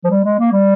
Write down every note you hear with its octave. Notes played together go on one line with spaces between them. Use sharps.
F3
G3
G#3
A#3
G3